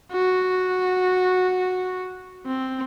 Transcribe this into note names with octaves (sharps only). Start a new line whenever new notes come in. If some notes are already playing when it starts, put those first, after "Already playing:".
F#4
C4